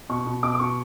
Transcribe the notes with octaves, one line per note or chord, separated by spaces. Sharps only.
B2 C#6
B2
B2 D6
D6
B2 C#6